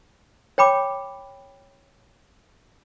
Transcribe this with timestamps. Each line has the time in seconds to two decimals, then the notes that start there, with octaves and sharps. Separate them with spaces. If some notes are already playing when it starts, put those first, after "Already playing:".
0.58 C#5 G5 B5 D6